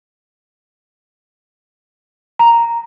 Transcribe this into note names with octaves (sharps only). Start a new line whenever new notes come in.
A#5